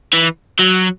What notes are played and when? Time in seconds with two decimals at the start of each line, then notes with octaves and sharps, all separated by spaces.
0.13 E3
0.59 F#3